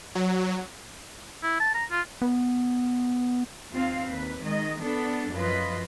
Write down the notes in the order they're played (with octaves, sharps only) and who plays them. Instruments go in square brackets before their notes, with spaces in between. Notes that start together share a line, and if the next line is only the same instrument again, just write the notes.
[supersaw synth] F#3
[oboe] E4
A5
A#5
F4
[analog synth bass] B3
[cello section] D#2 C4 F4 F5
D#2 B4
D#3 G#3 D#5
B3 D4 A4
F#2 F3 F4 B4 D#5